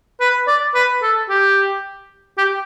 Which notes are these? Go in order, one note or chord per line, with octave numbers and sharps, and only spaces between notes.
B4
D5
B4
A4
G4
G4